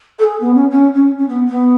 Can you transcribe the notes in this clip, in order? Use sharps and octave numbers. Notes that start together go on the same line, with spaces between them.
A4
G#4
B3
C#4
C#4
C#4
C#4
B3
B3